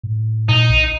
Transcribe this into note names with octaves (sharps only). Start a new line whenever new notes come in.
A2
A#2 D#4
B1